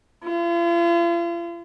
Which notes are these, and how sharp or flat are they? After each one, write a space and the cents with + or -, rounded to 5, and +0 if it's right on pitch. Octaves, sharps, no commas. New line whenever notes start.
F4 -40